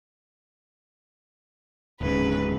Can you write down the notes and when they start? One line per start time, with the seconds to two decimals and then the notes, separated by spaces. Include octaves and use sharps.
2.01 D1 G#2 C#3 B4